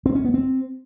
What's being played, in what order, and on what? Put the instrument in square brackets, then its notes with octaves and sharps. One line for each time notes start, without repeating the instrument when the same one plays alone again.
[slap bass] C4
C#4
B3
C4